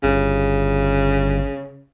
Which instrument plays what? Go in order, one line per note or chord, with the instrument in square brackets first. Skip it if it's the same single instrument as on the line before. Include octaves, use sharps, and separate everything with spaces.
[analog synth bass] G1 [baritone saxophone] C#3